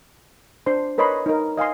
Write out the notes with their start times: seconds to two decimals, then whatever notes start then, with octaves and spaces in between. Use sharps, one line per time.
0.66 D4 C5 C6
0.98 A#4 B4 C#5 D#5 B5 C6
1.26 D#4 A#4
1.57 D#5 F5 G#5 C6